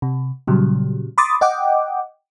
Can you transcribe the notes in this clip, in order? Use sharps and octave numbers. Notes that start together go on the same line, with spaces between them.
C3
A#2 C#3 F#3 G3
B5 C6 D6 D#6 A6
D#5 F#5 G5 D6